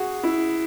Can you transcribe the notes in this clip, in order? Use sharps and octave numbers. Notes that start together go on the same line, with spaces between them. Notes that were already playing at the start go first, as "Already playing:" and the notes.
Already playing: F#4 G#4
E4